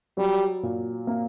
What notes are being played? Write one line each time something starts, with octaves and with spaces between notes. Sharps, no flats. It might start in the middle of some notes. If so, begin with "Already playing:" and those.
F#3 G3
A#2
A#3